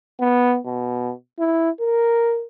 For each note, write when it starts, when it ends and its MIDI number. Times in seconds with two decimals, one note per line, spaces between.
0.20 0.58 59
0.66 1.12 47
1.39 1.70 64
1.80 2.45 70